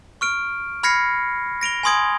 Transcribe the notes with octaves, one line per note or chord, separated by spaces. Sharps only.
C#6 F6 D7
B5 F6 G#6 A#6 C7 C#7
A#6 D7 F7 G7
G#5 B5 C6 D#6 G#6 D7